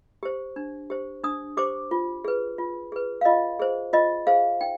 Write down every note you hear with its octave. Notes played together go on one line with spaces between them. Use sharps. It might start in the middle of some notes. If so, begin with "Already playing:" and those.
G4 C5
D4
G4 C5
D4 D#6
G4 C5 D6
F4
G#4 B4
F4
G#4 B4
F5
F4 D#5
G#4 C5
F4 D#5
G#4 C5 F5
D#4 G5